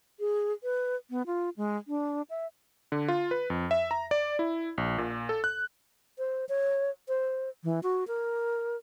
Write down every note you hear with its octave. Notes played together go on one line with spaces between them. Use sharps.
G#4
B4
B3
F4
G#3
D4
E5
D3
F4
B4
F2
E5
A#5
D5
E4
A#1
A#2
A4
F#6
C5
C#5
C5
E3
F#4
A#4